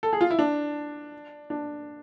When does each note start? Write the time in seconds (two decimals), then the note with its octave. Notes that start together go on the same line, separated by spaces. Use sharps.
0.03 A4
0.13 G#4
0.21 F4
0.31 E4
0.39 D4
1.50 D4